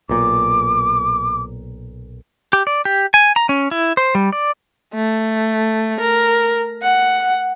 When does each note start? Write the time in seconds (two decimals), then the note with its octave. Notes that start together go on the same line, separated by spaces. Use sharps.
0.09 B1 A#2 D6
2.53 G4
2.67 D5
2.85 G4
3.14 G#5
3.36 A#5
3.49 C#4
3.71 E4
3.97 C5
4.15 G3
4.33 D5
4.94 A3
6.00 A#4
6.83 F#5